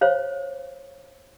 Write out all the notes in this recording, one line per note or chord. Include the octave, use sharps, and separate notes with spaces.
C5 C#5 F5